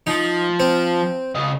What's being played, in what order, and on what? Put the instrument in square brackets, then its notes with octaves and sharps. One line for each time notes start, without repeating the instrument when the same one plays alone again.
[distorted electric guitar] F3 [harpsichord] D#4
[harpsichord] C4
[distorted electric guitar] C#3 D#5